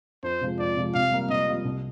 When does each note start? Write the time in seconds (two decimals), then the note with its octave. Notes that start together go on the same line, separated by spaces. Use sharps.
0.23 F2 C5
0.41 C3 F3 G#3
0.58 F2 D5
0.76 C3 F3 G#3
0.94 C3 F5
1.11 G3 A#3 F4
1.30 C3 D#5
1.47 G3 A#3 F4
1.65 C2